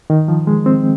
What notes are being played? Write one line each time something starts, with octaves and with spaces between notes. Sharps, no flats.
D#3
F3
G#3
C4